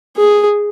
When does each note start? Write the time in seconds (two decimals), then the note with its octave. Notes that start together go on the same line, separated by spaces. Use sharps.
0.17 G#4